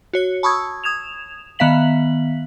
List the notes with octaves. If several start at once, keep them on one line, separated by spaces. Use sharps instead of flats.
F#4 C#5 C#7
A5 B5 C#6 D#6 E6 G#6
D#6 G#6 E7 F7
D#3 B3 E5 F5 B6 F#7